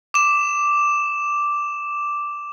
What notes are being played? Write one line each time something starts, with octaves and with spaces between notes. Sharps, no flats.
D6 E7